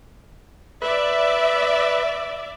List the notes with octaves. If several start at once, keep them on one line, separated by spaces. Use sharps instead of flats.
B4 D5 E5